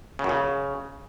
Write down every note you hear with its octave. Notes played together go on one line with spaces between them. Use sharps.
C#3
F#2
C#3